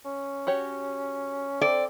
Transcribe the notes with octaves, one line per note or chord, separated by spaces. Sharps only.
C#4
F#4 G4 C#5
C4 A4 D5